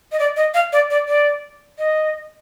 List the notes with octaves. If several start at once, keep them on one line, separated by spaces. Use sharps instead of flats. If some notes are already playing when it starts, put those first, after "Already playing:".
D#5
D5
D#5
F5
D5
D5
D5
D#5